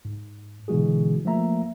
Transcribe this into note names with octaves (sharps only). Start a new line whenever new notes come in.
G#2
B2 D3 E3 G#3 F#4 G#4
F3 A3 A#3 E5 A#5